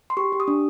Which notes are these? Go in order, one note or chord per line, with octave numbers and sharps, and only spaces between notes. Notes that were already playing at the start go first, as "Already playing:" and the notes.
C6
G4 C#6
G4
D#6
D4